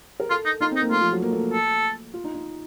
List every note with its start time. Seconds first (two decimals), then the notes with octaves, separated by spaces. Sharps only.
0.20 A#4
0.30 F4 A4
0.45 D#4
0.60 D#4 F4
0.71 C4 D#4
0.81 A#3
0.91 A3 F4
1.01 F3
1.12 F#3
1.22 A#3
1.33 A3
1.53 A4
2.14 F4
2.24 D#4
2.34 D#4